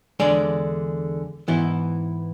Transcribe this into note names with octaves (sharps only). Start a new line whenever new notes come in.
E2 D3 G#3 D5
G#2 E3 B3 E4